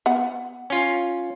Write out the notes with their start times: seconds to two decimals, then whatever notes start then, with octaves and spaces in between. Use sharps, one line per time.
0.06 B3 F#5 B5
0.70 C#4 F4